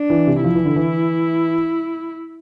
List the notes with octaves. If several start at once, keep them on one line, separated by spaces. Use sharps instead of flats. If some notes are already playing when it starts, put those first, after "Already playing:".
Already playing: D4
E3
C3
F3 E4
E3
D3
E3